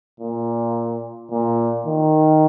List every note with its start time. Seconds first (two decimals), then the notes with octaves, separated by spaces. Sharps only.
0.20 A#2
1.31 A#2
1.86 D#3